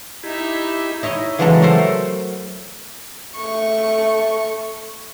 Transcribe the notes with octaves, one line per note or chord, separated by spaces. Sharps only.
D#4 E4 G4 E5
D#4 E4 C#5 D#5
C#3 E3 F#3 G#3 A4 A#5
F#3 A3 A4 A#4 C5
A3 C#6